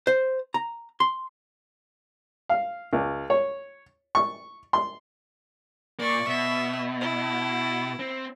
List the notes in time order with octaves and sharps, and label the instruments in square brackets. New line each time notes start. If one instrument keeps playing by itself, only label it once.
[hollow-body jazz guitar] C5
A#5
C6
[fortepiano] F5
C#2
C#5
C#6
C6
[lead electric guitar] A#2 A#3 [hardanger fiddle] D5 C#6
[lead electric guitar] B2 [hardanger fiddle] E5
[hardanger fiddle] E4
[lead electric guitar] C4